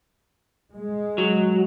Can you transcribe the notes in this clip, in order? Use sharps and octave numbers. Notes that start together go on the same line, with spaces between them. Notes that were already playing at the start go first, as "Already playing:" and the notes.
G#3
F#3